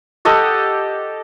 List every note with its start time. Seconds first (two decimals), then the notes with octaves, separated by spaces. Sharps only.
0.25 G4 A4 D#5 F#5